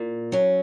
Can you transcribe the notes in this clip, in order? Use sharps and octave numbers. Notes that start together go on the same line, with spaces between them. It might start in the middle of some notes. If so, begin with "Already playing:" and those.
Already playing: A#2
F#3 C#4